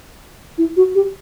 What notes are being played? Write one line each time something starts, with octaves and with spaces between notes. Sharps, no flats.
E4
F#4
G4